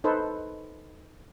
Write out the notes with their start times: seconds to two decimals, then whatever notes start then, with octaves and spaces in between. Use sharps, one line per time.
0.04 D#4 A4 B4 C5